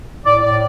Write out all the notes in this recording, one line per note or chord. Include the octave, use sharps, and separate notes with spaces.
A2 D5
A2 D5